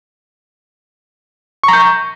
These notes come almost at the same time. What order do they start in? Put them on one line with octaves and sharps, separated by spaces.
C#6 A#5 G6